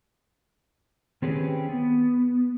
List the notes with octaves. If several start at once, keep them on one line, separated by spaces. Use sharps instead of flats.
D#3 C4 C#4 G4 G#4 B4
B3